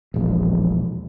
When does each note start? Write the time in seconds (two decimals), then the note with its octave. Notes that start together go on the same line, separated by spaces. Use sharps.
0.14 E1 A#1